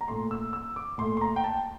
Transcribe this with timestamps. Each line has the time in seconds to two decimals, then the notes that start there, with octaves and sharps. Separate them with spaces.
0.01 A#5
0.08 A#2 A3 C6
0.31 E6
0.53 E6
0.76 D6
0.98 A#2 A3 C6
1.17 C6
1.21 A#5
1.36 G5
1.44 A5